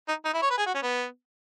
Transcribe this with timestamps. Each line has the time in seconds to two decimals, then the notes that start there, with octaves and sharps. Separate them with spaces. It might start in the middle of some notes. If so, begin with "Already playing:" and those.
0.08 D#4
0.25 D#4
0.34 E4
0.42 C#5
0.50 B4
0.58 G#4
0.66 F#4
0.74 C#4
0.82 B3